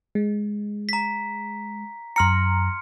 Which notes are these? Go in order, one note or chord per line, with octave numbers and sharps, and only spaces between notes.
G#3
A#5 B6
F#2 A#5 C6 F6 C#7